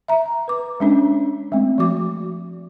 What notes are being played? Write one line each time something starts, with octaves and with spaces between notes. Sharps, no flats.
E5 A#5
B4 D6
G#3 C#4 D4 C#5
G#3 A3 C4
F3 A3 F#4 D6